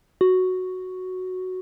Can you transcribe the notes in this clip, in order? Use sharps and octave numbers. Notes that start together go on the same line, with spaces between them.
F#4